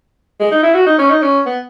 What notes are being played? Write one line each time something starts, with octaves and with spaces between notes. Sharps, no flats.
G#3
D#4
E4
F#4
D#4
C#4
D#4
C#4
B3